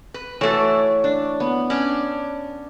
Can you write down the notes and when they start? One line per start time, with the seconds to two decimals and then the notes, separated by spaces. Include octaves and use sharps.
0.14 B4
0.41 E3 A3 F#4 A4 C#5
1.04 D4
1.40 B3
1.70 C#4 D4